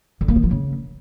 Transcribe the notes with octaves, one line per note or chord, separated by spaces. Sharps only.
D3
A#3
D#3
F3
C#3